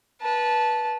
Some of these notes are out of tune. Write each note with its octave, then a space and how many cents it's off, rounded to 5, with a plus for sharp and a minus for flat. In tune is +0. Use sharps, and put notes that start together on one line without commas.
B4 -20 A5 -10